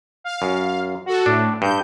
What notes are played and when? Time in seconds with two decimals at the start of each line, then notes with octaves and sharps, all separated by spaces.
0.24 F5
0.42 F#2
1.06 F#4 A4
1.26 A2 D4
1.62 G2 G6